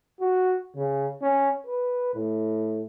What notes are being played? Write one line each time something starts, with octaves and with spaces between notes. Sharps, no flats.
F#4
C#3
C#4
B4
A2